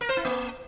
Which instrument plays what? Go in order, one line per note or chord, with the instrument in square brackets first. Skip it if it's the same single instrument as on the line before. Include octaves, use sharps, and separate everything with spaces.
[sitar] A#4
C5
E4
A#3